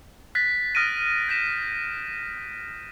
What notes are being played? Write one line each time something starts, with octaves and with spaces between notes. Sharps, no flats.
F#6 A6 B6
D#6 F6 F#6 A#6 D7 D#7
G6 A#6 B6 E7